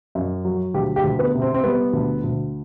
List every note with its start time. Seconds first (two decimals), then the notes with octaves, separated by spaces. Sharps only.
0.15 F#2
0.45 F#3
0.74 D2 G4
0.96 G4
1.04 D2
1.19 B3
1.34 C3
1.42 C4
1.54 C4
1.64 G3 B3
1.93 D2
2.24 D2